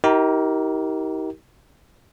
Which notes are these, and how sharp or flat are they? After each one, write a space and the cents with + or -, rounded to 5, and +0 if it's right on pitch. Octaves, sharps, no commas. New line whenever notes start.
D#4 +40 G4 -30 A#4 +0